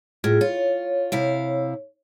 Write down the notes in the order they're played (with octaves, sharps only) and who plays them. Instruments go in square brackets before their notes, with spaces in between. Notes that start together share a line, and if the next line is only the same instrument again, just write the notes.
[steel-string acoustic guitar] A2 [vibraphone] F4 G#4
[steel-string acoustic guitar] F4 [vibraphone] C#5
[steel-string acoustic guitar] C3 E4 F5